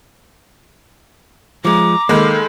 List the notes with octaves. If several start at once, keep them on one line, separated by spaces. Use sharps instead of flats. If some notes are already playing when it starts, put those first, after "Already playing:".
F3 G#3 A#5 D6
D#3 G#3 A#3 A4 B5